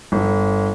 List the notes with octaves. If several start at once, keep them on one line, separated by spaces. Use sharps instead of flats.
G1